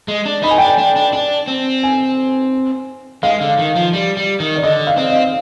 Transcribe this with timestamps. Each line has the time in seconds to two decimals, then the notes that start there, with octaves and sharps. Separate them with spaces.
0.08 G#3
0.26 D4
0.43 D#4 B5
0.50 G#5
0.58 D4 G5
0.67 G#5
0.78 D4
0.96 D4
1.13 D4
1.48 C4
1.83 G#5
3.23 G#3 F5
3.41 D3
3.59 D#3
3.76 F3
3.93 G3
4.17 G3
4.40 D#3
4.56 D5
4.63 D3 D#5
4.87 F5
4.98 C4
5.10 D#5